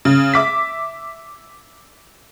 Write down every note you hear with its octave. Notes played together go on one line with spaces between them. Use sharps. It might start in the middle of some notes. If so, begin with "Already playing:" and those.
C#3
E5 D6 B6